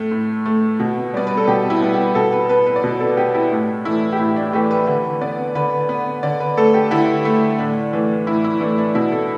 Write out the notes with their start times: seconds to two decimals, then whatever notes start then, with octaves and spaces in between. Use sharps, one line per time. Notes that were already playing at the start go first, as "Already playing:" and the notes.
Already playing: A2 A3
0.11 A2
0.46 A3
0.80 B2
1.14 G3 B3 D5
1.27 B4
1.37 A4
1.47 B2 G4
1.70 E4
1.81 G3 B3
1.93 G4
2.15 B2 A4
2.32 B4
2.49 B3 B4
2.66 B4
2.76 D5
2.84 B2 B4
3.00 A4
3.17 B3 G4
3.34 E4
3.51 A2 D4
3.85 E3 A3 E4
4.13 G4
4.19 A2 E4
4.36 D4
4.53 E3 A3 G4
4.71 B4
4.87 D3 B4
5.21 B3 D5
5.55 D3 B4
5.89 B3
6.23 D3 D5
6.40 B4
6.57 A3 A4
6.74 G4
6.91 D3 E4
7.25 A3
7.59 A2 D4
7.93 E3 A3
8.27 A2 E4
8.44 E4
8.61 E3 A3 D4
8.78 D4
8.95 B2 E4
9.12 A4